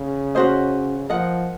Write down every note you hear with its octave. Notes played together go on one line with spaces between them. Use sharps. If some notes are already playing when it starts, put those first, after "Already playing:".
Already playing: C#3
C#4 F#4 C5 D#5
F3 A#4 D#5 F#5